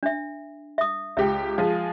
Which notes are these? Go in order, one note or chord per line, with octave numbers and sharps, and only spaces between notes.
D4 E5
E5 D#6
C#2 G4 E5 G5
F3 G#3 F5